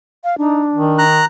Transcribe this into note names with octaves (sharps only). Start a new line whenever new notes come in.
F5
D4 D#4
D#3
A#5 F#6